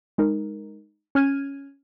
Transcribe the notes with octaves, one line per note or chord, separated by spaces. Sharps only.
G#3 D#4 A#4
C#4 F6 G#6 D#7